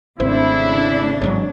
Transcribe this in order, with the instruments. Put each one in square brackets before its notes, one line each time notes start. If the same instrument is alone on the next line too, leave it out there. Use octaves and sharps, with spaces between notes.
[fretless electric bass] G#1 [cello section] C#3 A3 D4 [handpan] C4 C5 [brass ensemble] E4
[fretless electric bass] A1 G#2 F#3 [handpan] C#5